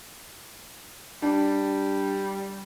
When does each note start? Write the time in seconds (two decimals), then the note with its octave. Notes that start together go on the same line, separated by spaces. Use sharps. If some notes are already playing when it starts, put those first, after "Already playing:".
1.22 G3 D4